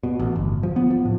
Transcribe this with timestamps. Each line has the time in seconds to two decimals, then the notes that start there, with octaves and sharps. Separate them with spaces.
0.03 B2
0.19 A1
0.36 G1
0.63 F3
0.76 B3
0.90 F3
1.05 A2